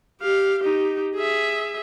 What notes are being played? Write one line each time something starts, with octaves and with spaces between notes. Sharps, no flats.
G4 F5
D#4 G4
G#4 E5